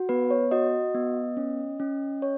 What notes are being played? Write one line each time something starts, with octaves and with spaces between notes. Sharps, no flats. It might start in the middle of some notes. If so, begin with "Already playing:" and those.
Already playing: F#4
B3 B4
C#5
F#4 D#5
B3
C#4
C#4
C#5